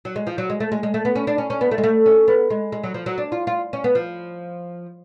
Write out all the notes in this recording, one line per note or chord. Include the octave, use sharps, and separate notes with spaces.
F#3
G#3
F3
F#3
G#3
A3
G#3
G#3
A3
B3
C#4
D4
C#4
C#4
B3
A3
G#3
A3
C#4
B3
G#3
G#3
F#3
F3
F#3
D4
F4
F4
C#4
B3
F3